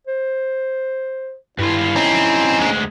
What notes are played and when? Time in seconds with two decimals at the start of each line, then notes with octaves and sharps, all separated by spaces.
0.07 C5
1.59 G2 E4 F4
1.96 C4 C#4 D#4
2.58 D2 G#3